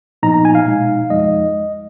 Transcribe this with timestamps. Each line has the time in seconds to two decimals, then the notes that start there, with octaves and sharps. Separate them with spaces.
0.23 A#2 F3 B3 D#4 A#5
0.34 A#5
0.45 G#5
0.55 F5
0.66 B2 G#3 D#4
1.10 F2 F3 G#3 D#4 D#5